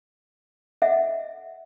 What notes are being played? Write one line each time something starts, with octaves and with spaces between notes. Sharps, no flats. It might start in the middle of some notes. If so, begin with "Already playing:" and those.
A4 D#5 E5 F#5